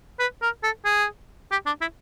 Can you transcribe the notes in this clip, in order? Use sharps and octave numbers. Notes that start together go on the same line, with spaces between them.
B4
A#4
A4
G#4
G4
D4
E4